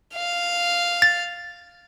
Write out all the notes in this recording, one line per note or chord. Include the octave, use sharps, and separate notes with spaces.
F5
A6